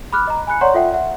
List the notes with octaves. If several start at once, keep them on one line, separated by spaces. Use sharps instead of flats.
B5 D6 F6 F#6
D#5 A#5
G#5 B5 F#6 C#7
C#5 D5 F#5 A#5 C6 C#6
F4 A4 E5 F#5 G5
E5 F#5